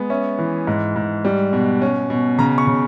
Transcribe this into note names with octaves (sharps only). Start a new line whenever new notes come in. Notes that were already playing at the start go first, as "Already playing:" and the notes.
Already playing: G#3 B3
C#4 E5
E3
G#2
G#2
G3
B2
C#4
B2
C#3 A#5
C#6
C#3